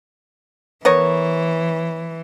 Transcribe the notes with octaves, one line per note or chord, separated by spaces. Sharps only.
E3 B3 A#4 C#5